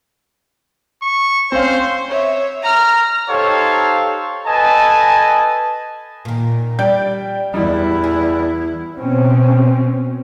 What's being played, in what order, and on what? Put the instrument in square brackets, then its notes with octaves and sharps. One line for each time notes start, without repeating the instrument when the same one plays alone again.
[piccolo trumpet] C#6
[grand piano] C4 C#4 F5 [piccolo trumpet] C5
[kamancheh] C#5 E5
A#5 F6
[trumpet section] D#4 G4 A4 C5 C#5 F5
A4 B4 D#5 G#5 A5
[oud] A#2 D#3
[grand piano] G3 G5 G6 [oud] D5
[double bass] E2 E4 [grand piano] G3
[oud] G#4
[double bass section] B2 C4 C#4